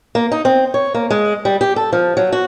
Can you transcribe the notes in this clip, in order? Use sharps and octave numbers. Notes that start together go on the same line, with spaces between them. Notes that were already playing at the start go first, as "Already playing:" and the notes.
A#3
D#4
C4
C#5
A#3
G#3
G3
G4
A4
F3
F#3
F#4